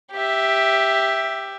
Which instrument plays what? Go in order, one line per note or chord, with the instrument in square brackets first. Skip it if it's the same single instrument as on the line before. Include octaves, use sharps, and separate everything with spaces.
[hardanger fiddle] G4 E5